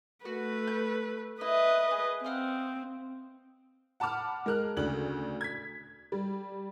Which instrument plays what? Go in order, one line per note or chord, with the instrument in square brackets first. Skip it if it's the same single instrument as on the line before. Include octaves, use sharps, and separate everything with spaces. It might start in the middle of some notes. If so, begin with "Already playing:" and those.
[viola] A3 B4 [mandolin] F#4
[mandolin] G6
[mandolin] E4 [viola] B4 D#5
[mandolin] G#4
[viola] C4 [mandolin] D#5 F5 F#5
[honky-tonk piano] F#5 A5 B5 D6 F6
G#3 A#4 F6 F#6
D2 C#3 D4 F#7
G#6 B6
G3